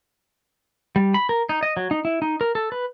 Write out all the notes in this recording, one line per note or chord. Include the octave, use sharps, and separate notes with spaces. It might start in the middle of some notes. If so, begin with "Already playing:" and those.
G3
B5
A#4
D#4
D#5
F#3
D#4
E4
D#4
A#4
A4
B4